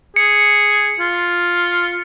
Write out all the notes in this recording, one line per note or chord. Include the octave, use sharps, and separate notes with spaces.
G#4 C#7
F4